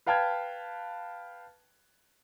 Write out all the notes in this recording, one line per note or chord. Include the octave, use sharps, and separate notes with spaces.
B4 F5 G5 A5 F6 G#6